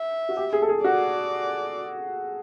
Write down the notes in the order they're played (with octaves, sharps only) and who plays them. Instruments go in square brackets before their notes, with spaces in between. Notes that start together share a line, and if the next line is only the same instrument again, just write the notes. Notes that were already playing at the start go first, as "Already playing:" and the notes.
Already playing: [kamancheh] E5
[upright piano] F#4
G4
G#4
A4
G#4
[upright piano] F#4 [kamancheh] D5